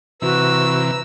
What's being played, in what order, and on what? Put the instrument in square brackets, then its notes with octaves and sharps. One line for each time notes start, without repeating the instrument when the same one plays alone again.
[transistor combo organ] C3 E3 [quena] F#4 [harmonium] B4 A#5 [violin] E6